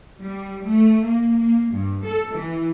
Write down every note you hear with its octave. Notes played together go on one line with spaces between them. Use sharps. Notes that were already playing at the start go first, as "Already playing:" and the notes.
G3
A3
A#3
A#3
G2
A4
E3